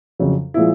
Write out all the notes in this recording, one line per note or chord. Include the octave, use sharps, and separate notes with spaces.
F2 C#3 F#3
A#2 F3 G#3 E4